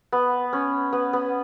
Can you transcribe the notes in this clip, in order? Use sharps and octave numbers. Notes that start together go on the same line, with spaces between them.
B3
C#4
B3
B3